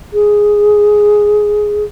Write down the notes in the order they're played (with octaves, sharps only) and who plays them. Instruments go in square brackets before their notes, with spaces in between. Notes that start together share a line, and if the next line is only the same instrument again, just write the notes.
[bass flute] G#4